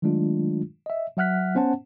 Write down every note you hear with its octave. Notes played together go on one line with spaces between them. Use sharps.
D#3 F#3 G#3 A3 D4 F4
D#5 E5
F#3 E5 F#5 F6 F#6 B6
B3 C#4 C5 F#5 A5